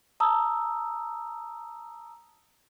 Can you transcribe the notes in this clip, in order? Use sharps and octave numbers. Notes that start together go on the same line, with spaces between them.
A5 A#5 D#6 E6